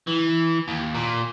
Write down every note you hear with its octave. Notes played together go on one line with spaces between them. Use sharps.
E3
D#2
A#2